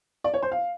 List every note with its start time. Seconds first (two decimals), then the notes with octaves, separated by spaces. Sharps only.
0.24 D5
0.34 C#5
0.42 C5
0.52 F5